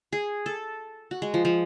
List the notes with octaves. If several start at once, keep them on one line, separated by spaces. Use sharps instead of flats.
G#4
A4
F#4
G#3
F3
F3